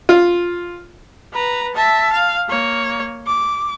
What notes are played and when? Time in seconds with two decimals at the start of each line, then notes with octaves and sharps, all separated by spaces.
0.09 F4
1.33 B4 A#5
1.74 E5 A5
2.12 F5
2.48 A#3 C#5
3.27 D6